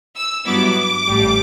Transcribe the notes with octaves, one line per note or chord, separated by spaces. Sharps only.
E6
G2 F#3 B3 E4 D6
A1 A2 G3